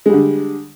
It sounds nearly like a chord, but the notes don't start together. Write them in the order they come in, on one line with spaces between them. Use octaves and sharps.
G#3 G3 D3